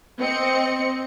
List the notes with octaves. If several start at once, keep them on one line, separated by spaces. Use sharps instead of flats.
C4 D#5 C#7